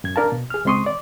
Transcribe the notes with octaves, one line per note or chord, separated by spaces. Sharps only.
F#2 G#6
D4 A#4 F5 A5
B2
G#4 F6
C#2 G#3 C4 C6 C#6 D#6
D5